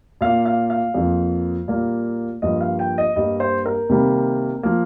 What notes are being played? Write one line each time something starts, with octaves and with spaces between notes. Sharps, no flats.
A#2 A#3 F5
F5
F5
F2 F3 A#3
A#2 G3 A#3
G2 F3 A#3 D#5
F5
G5
D#5
G2 G3 A#3 D#5
C5
A#4
C3 D#3 G3 A#3
F3 A#3